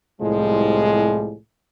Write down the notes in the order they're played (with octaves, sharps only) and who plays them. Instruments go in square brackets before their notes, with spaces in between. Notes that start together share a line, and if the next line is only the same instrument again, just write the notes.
[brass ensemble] C2 A2 F3 G3 G#3